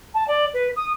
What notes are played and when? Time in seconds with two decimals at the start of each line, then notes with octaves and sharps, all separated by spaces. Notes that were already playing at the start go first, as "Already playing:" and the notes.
0.14 A5
0.28 D5
0.54 B4
0.76 D#6